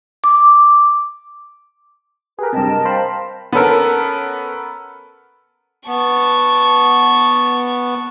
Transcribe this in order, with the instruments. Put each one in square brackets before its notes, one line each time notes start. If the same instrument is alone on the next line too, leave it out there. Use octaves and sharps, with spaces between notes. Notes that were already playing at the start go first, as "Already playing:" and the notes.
[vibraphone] D6
[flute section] G4 B4 [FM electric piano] G#4 A#4
[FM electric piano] G2 C3 [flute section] D#5 G5 A5
[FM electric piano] A#4
C5 F5 B5
[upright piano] B3 C#4 A4 A#4
[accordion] B3 [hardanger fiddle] A5 C#6